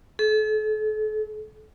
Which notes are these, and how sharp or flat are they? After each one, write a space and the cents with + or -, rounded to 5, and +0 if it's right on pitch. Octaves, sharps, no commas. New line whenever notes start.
A4 -40